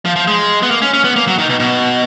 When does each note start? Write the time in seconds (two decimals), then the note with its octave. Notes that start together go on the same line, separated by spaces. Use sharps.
0.05 F3
0.16 F3
0.27 G#3
0.63 B3
0.71 A#3
0.82 C#4
0.94 C#4
1.04 B3
1.16 A#3
1.27 F#3
1.38 D#3
1.49 B2
1.60 B2